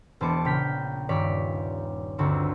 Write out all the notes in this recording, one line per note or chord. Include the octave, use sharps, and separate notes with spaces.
E1 B3 C5 A5 D6 C#7
A#1 C#3 G5 F6 B6
D#1 G2 C#5 D5 B6
G1 D2 C4 C#6